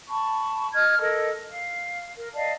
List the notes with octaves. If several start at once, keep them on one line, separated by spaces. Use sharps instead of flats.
A5 B5 C#6
D#5 F6 G#6
A4 A#4 D#5
F5
A#4
D5 D#5 F5 A5